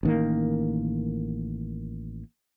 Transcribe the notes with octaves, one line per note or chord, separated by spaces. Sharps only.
A1 D#3 A#3